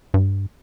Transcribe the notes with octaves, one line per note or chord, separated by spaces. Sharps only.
G2